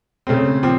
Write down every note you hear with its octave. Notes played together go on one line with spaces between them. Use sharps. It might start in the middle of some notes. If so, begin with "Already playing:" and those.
C#3 A3 C4
A#2 F3 C4